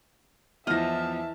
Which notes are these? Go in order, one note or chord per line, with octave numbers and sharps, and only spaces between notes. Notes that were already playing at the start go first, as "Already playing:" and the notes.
E2 E3 F3 D#5 E5 A5 F6 A#6